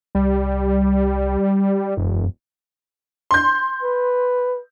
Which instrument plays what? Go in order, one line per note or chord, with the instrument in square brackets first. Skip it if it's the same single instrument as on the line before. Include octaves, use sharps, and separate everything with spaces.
[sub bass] C2 [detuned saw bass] G3
[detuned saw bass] E1 [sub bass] F#2
[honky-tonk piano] C6 G6
[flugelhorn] B4